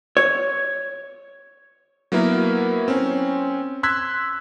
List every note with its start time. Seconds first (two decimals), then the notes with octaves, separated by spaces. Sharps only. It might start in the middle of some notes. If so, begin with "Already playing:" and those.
0.17 C#5
2.12 F#3 A#3 B3 E4 A#4
2.88 C4 C#4
3.83 C6 E6 F#6 G#6 B6